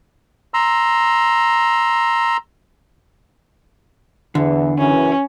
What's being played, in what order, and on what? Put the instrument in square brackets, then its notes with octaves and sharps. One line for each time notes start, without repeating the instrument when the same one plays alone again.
[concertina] A#5 C6 E6
[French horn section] E2 E3 [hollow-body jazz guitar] D3
[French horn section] F#2 C#3 E3 [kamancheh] C#4